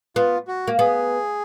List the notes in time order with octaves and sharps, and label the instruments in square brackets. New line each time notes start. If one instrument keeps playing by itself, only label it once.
[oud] B3 [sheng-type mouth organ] F4
[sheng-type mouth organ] F#4
[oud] A#3
[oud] B3 [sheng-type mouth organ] G#4